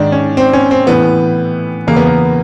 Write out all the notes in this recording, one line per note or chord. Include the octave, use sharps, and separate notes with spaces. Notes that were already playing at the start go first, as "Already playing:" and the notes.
Already playing: G#2 D#3 D4
C#4
C4
C#4
C4
A2 E3 B3
E2 C#3 E3 A#3
B3
A#3